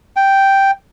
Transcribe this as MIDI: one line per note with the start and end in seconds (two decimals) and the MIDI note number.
0.16 0.71 79